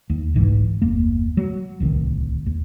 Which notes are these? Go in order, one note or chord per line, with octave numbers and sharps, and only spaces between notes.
D#2
G1 C2 G#2 E3
F#1 D#2 A#3
F#3
D1 C2 C3 D#3
D#2